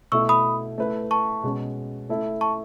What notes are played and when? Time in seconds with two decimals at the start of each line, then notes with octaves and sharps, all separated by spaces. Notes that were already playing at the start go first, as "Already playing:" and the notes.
0.12 B2 A3 E4 A4 C#6 E6
0.29 B5 D#6
0.78 A3 E4 B4
1.11 A5 C#6
1.43 B2 G#3 C#4
2.09 A3 E4 A4
2.41 A5 C#6